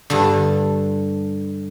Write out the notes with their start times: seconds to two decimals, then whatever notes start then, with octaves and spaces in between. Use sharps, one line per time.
0.10 G2 D3